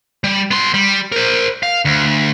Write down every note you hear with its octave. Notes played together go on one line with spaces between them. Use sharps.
G3
B3 C6
G3
A#4 C5
F5
D2